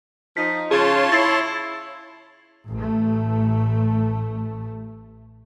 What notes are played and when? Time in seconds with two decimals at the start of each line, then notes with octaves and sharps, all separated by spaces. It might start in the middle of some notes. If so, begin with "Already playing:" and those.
0.37 F3 D#4 B6
0.71 C#3 F4 G#4 C#5 A5 C6
1.12 E4 A6 C7
2.70 A1 A3